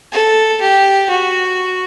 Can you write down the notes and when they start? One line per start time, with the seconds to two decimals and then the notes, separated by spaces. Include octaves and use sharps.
0.12 A4
0.61 G4
1.09 F#4